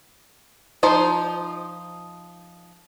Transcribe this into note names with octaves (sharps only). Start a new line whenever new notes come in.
F3 D#4 C5